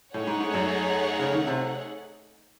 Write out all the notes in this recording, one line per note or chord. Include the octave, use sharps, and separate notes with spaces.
A2 A3 D#4 G#4 C#5 F#5
G#2
G#2
F#2
C#3
D#3
C3